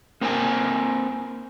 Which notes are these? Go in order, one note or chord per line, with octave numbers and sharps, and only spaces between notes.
A#3 C4 A#4 C5 G5 G#5